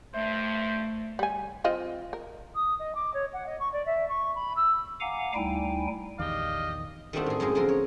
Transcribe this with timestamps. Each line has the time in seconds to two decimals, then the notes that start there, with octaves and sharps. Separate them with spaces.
0.14 G2 A3 C5 E5
1.19 G3 G#5
1.64 C4 F4 D#5
2.13 A#4
2.55 D#6
2.79 D#5
2.95 D6
3.14 C#5
3.33 F#5
3.46 D#5
3.60 C#6
3.73 D5
3.86 E5
4.09 C#6
4.35 B5
4.56 E6
5.01 F5 F#5 G#5 A#5 D6
5.35 D2 G3 D#4 E4 G5 G#5
6.19 A#1 E2 D#3 G4 D5 D#5 F5
7.13 D#3 G3 A3 C4 D4 F#4
7.26 A2 G#4
7.40 F#2 A2 D#3 G#3 G#4
7.55 D3 F3 A#4 C6
7.69 C#5